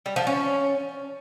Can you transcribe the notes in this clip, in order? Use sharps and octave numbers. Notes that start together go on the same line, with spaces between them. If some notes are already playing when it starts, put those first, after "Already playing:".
G3
F3
C#4